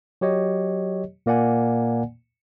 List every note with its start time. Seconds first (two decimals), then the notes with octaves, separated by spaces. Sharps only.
0.21 F#3 G4 C#5 D#5
1.26 A#2 A#3 D5 F#5 G#5